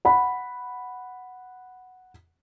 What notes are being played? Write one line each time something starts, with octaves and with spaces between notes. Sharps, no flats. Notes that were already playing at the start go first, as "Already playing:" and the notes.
F#5 B5